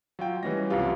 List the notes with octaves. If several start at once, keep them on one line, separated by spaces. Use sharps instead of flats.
F#3 F4 G5
E3 G3 A3 C#4 G4 A#6
C2 F#2 F4 G4